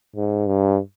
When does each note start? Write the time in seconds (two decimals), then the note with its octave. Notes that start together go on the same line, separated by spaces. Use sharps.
0.16 G#2
0.47 G2